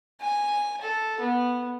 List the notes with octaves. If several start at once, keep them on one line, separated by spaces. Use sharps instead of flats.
G#5
A4
B3